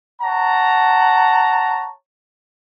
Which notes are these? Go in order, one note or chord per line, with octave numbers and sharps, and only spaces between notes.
C#5 F#5 A5 A#5